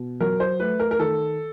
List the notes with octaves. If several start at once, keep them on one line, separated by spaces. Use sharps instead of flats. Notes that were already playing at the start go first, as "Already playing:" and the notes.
Already playing: B2
F#3 A#4
C5
A3 B4
A#4
A#4
D#3 A4